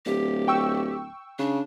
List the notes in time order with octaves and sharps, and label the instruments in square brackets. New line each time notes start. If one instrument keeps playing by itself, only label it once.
[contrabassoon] D1 [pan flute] G4
[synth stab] G5 C#6 E6
[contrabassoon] C#3 [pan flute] D4